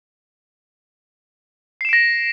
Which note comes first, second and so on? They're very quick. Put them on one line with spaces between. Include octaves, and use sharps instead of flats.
C7 E7 D7 A#6